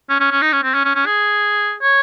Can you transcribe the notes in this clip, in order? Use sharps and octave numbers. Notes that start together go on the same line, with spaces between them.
C#4
C#4
C#4
D#4
C#4
C4
C#4
C#4
C#4
G#4
C#5